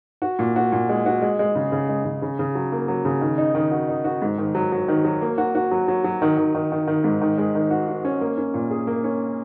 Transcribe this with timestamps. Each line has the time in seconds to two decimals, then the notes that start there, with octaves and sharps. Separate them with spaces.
0.22 F#4
0.39 A#2
0.56 F#4
0.72 A#2
0.89 G#3
1.06 F#4
1.22 G#3
1.39 G#3
1.55 C#3
1.72 C#3
1.89 G#3
2.05 C#3
2.22 C#3
2.39 C#3
2.55 F#3
2.72 A#3
2.88 F#3
3.05 C#3
3.21 D#3
3.38 D#4
3.55 D#3
3.71 F#4
3.89 D#4
4.04 F#4
4.22 G#2
4.38 D#3
4.55 F#3
4.72 F#3
4.88 D#3
5.05 F#3
5.21 A#3
5.38 F#4
5.55 F#4
5.71 F#3
5.88 F#3
6.04 F#3
6.22 D#3
6.37 D#3
6.55 D#3
6.72 D#3
6.88 D#3
7.04 G#2
7.21 D#3
7.38 G#3
7.55 D#3
7.71 F#4
7.88 F#4
8.05 C#4
8.21 A#3
8.38 C#4
8.54 A#2
8.71 G#4
8.87 A#3
9.04 C#4